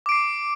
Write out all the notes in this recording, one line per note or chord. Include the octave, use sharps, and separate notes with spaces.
D6 C7 D7